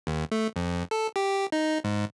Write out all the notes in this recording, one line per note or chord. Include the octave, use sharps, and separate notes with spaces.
D#2
A3
F2
A4
G4
D#4
G#2